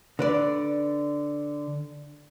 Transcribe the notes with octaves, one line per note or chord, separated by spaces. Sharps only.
D3 B4 D5